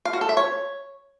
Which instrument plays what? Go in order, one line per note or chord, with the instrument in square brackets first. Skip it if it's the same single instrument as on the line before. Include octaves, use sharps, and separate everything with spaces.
[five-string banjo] F5
F#4
A4
E5
C#5